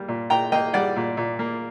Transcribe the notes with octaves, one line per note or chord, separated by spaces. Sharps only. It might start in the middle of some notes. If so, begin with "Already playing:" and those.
Already playing: G3 A#3
A#2
A#2 G5 A#5
A#3 D#5 G5
G3 D5 F#5
A#2
A#2
A#3